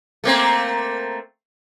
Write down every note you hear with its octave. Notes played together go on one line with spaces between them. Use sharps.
A3 A#3 C4